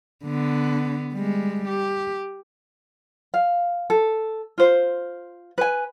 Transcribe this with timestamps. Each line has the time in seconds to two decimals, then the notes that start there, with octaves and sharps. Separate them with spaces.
0.24 D3 B3
1.15 G3 G#3
1.68 G4
3.34 F5
3.90 A4
4.58 F4 C5
5.58 B4 G#5